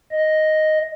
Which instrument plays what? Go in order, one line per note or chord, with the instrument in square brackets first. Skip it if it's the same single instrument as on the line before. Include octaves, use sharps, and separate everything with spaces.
[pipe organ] D#5